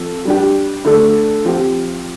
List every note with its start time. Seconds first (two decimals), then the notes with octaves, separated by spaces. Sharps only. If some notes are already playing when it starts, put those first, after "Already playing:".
Already playing: F3 C4 A4
0.25 G3 D4 G4
0.85 D3 A3 D4 A4
1.45 F3 C4 G4